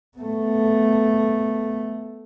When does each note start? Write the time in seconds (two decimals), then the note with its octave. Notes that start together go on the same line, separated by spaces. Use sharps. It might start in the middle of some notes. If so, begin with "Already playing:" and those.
0.18 A3 B3